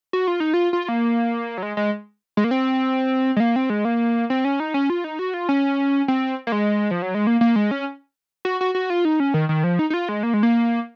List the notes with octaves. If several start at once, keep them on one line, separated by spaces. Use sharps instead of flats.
F#4
F4
D#4
F4
F4
A#3
F#3
G#3
G#3
G#3
A#3
C4
G#3
A#3
C4
G#3
A#3
C4
C#4
D#4
C#4
F4
D#4
F#4
F4
C#4
C4
A#3
G#3
F3
F#3
G#3
A#3
A#3
G#3
C#4
F#4
F#4
F#4
F4
D#4
C#4
D#3
D#3
F3
D#4
D#4
F4
G#3
A#3
G#3
A#3